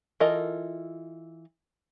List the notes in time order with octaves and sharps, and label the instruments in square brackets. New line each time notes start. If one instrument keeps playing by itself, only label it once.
[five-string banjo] E3 F4 A4 A#4 D#5